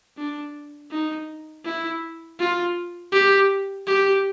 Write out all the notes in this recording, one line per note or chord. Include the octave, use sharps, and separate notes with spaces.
D4
D#4
E4
F4
G4
G4